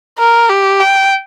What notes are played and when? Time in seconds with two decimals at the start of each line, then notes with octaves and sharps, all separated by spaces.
0.19 A#4
0.49 G4
0.80 G5